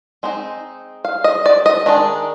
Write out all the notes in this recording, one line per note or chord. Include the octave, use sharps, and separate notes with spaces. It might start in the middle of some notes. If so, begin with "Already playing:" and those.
G#3 C4 D#4
F5
D#5
D5
D#5
D#3 G#3 D4